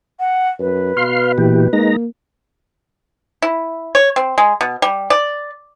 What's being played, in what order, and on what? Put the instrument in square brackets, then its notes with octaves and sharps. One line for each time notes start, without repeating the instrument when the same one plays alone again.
[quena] F#5
[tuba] F#2 [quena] B4
[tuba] B2 [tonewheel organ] F5 C6
[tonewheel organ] A#2 E3 G4
[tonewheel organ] G#3 D#4 A#5 [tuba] A#3
[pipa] E4
C#5
C4
G#3
B2
G3
D5